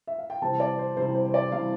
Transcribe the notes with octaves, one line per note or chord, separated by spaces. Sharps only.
E5
F5
G5
C3 E3 G3 C4 A5
D5
C5
C3 E3 G3 C4 C5
C5
C5
D5
C3 E3 G3 C4 F5